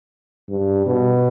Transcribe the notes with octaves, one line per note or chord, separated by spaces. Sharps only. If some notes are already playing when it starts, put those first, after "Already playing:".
G2
B2